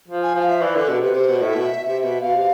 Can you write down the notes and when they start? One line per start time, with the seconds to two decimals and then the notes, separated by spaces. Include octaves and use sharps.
0.08 F3
0.23 G#5
0.35 F3 F5
0.49 E5
0.62 E3 D5
0.75 D3 B4
0.88 B2 A4
1.02 C3 B4
1.15 C3 C5
1.29 B2
1.42 A2 E5
1.55 B2
1.85 C3
2.04 B2
2.21 B2 F5
2.35 C3